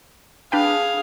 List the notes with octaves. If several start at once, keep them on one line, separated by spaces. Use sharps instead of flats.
D4 G#4 B4 F5 G5